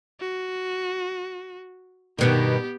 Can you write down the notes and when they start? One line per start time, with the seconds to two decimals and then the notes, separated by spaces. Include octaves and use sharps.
0.20 F#4
2.19 G2 B2 D#3 B3 G4